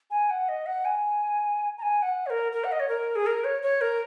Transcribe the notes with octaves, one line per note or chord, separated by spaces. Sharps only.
G#5
F#5
D#5
F#5
G#5
A#5
G#5
F#5
C#5
A#4
A#4
F#5
D#5
C#5
A#4
G#4
A#4
C#5
C#5
A#4